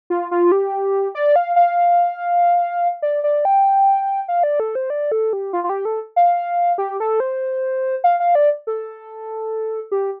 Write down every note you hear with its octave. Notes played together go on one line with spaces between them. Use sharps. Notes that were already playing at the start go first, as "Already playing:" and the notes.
F4
F4
G4
D5
F5
F5
D5
D5
G5
F5
D5
A4
C5
D5
A4
G4
F4
F4
G4
A4
F5
G4
A4
C5
F5
F5
D5
A4
G4